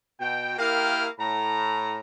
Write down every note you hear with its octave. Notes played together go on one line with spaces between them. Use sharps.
B2 G5
A#3 E4 G4 A#4 F5 G5
A2 A#5